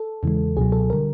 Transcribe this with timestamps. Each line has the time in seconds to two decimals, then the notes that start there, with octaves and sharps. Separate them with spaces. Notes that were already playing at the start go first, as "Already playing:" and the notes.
Already playing: A4
0.23 E2 C#3 E3 G#3
0.57 C#2 B2 F#3 G#4
0.72 A4
0.90 D3 G3 A#4